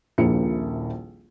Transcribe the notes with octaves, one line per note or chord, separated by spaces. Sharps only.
D#1 A#1 F3 A#3 E4 C#7